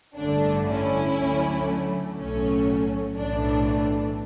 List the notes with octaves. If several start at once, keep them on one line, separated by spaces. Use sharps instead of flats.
A1 G2 D3 A3 D4
C#4 E4
D2 D3 F#3 A3
B1 A2 F#3 A3 C#4
B1 A2 E3 A3 D4